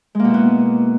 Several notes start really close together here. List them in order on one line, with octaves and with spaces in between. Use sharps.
G#3 A#3 B2 E4 B3